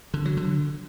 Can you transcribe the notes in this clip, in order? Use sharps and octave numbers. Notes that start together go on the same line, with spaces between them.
D3
F#3
D3